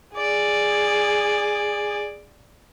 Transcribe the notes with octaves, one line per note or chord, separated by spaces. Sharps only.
G#4 D5